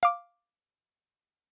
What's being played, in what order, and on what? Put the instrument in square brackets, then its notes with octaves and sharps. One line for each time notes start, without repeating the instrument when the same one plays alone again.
[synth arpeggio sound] F5 D6